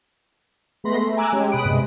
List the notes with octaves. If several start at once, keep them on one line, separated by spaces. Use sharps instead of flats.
G#3 A3 B3 B5 C6 A#6
A3
G#5 A#5 D6 E6 F#6 G#6
G#3 C#4 G4
B2 B5 D#6 F#6 D7
G2 C3 G#3